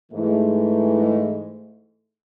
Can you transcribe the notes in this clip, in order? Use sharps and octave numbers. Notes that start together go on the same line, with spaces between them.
G#2 E3 A3